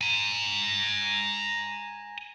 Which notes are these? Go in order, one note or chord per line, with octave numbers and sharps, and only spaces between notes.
G#5 A#5